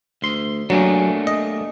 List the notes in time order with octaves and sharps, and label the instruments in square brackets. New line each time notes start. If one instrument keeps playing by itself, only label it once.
[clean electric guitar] D2 C6
[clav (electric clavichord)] F#3 [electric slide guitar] A3 A#3 G4 [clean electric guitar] D4 G#4
[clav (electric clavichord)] D#5